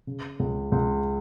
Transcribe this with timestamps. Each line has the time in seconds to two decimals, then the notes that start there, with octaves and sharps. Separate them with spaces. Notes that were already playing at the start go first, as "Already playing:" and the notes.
0.07 C#3
0.39 C#2
0.72 C#2